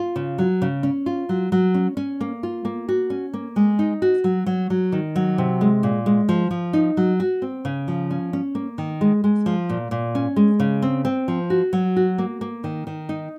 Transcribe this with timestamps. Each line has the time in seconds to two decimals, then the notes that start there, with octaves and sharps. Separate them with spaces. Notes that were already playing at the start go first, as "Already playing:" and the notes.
Already playing: F4
0.16 C#3
0.38 F#3
0.62 C#3
0.83 C#4
1.06 F4
1.29 F#3
1.52 F#3
1.74 C#4
1.97 C#4
2.21 A#3
2.43 F4
2.65 A#3
2.89 F#4
3.10 C#4
3.34 A#3
3.56 G#3
3.79 D#4
4.02 F#4
4.24 F#3
4.46 F#3
4.70 F#3
4.92 D#3
5.16 F#3
5.38 C3
5.61 G#3
5.83 A#2
6.06 G#3
6.29 F3
6.51 F3
6.73 D#4
6.97 F#3
7.20 F#4
7.42 C4
7.65 C#3
7.88 F3
8.10 C#4
8.33 C#4
8.55 A#3
8.78 D#3
9.01 G#3
9.24 G#3
9.46 F3
9.70 A#2
9.91 A#2
10.15 C#4
10.36 G#3
10.60 C#3
10.82 C4
11.05 C4
11.28 F3
11.50 F#4
11.73 F#3
11.96 F#4
12.18 A#3
12.41 A#3
12.64 D#3
12.87 D#3
13.09 D#4